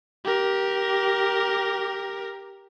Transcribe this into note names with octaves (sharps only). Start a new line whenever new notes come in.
G4 A#4